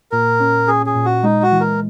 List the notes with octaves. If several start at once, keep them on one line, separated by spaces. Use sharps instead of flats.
A#2 A#4
C#4
C#4 G#4
G#4
A#2
F#4
G#3 D#4
F#4
E3
A#4